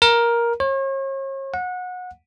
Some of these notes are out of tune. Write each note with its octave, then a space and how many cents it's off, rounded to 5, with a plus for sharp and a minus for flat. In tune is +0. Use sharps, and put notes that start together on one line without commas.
A#4 +10
C#5 -40
F#5 -25